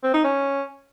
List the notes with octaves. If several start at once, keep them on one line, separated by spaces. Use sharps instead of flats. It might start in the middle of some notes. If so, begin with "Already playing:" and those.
C4
D#4
C#4